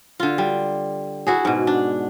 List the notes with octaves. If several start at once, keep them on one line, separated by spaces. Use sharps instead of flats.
D3 F4
G3
E4 F#4 G#4
G#2 B2
D4